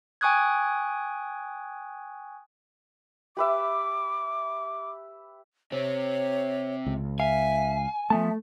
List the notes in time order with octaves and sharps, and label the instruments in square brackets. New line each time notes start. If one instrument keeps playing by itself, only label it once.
[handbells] G5 G#5 C#6 D#6 F#6 G#6
[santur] G4 B4 E5 [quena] D6
[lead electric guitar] C3 C4 [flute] C#5
[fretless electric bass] C#2
[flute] E5 [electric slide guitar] F5 [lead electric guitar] G#5
[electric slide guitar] F3 B3 A5 [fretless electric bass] A3 [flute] E5